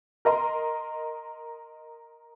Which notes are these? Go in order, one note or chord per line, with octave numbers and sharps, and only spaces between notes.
A#4 D#5 A#5 C6